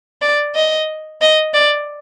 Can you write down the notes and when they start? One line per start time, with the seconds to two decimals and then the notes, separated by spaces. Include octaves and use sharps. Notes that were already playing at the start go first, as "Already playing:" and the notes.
0.22 D5
0.55 D#5
1.22 D#5
1.54 D5